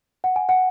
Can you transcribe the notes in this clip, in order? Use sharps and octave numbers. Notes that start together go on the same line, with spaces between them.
F#5
G#5
F#5